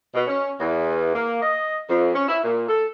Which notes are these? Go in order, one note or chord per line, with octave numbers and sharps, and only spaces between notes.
B2
C#4
E2
A#3
D#5
F2
C#4
E4
A#2
A4